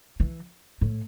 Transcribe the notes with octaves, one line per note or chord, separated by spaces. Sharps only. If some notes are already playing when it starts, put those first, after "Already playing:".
E3
A2